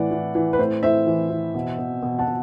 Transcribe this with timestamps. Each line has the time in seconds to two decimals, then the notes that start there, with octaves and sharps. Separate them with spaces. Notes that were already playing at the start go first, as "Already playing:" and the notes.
Already playing: A2 E3 D5 F#5
0.11 E3
0.35 E3
0.53 B4
0.59 A2 C5
0.83 A2 C5 E5
1.07 E3
1.30 E3
1.55 B2
1.79 B2
2.03 B2
2.19 F#5 A5
2.27 B2